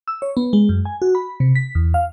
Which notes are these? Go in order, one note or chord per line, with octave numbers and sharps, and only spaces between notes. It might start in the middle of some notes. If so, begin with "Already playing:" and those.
E6
C#5
B3
G#3
F#2
G#5
F#4
B5
C3
B6
E2
F5